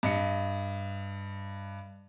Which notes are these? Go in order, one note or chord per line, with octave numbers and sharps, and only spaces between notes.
G2 D#5 C#7